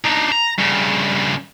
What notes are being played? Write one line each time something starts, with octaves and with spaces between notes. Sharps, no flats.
D4 D#4
A#5
G2 C#3